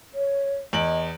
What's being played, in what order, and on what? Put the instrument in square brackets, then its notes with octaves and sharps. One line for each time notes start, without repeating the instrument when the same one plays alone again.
[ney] C#5
[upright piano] E2 D7 F#7 [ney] D#5